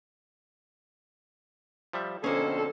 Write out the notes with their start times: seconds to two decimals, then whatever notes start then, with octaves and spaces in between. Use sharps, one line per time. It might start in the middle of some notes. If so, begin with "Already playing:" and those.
1.93 F3 G3 E5
2.24 F2 B2 D3 A#3 C#4 G#4 A4 C5